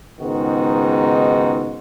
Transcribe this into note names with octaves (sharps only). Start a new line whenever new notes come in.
C#2 G#2 D#3 B3 D#4 F#4